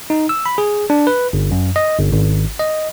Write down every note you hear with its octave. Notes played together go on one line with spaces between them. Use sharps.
D#4
E6
B5
G#4
D4
B4
G1
F#2
D#5
G1
G#1
D#5